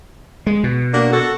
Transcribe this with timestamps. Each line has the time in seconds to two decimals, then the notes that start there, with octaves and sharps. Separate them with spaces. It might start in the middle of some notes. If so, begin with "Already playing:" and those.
0.47 G#3
0.64 B2
0.92 A#3 D4 F#4
1.12 F#4 A4